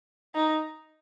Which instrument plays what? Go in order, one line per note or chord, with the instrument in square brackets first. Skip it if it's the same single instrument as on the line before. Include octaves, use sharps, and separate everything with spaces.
[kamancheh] D#4